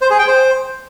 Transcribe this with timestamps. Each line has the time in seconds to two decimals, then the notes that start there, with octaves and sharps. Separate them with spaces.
0.02 C5
0.10 G#4
0.19 G5
0.27 C5